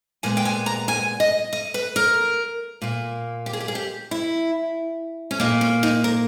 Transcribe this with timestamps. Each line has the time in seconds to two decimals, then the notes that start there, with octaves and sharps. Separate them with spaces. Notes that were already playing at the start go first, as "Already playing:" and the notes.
0.23 A#2 G#3 B3 G#5
0.37 G5
0.45 G#5
0.66 A#5
0.88 G#5
1.20 D#5
1.53 D#5
1.74 B4
1.96 A#4
2.82 A#2 A#3
3.46 G4
3.53 G#4
3.60 G4
3.68 G#4
3.75 G4
4.11 E4
5.31 C#4
5.40 A#2 A#3 D#4
5.61 C#4
5.83 D#4
6.04 A#4